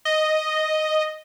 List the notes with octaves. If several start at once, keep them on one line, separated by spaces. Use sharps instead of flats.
D#5